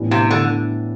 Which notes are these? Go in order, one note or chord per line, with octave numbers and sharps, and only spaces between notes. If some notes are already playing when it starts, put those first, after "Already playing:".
Already playing: A2 E3 G3 B3 D4
C3
D3